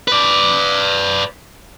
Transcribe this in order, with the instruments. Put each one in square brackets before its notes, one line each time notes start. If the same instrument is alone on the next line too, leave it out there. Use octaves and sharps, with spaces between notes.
[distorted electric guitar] B4 D5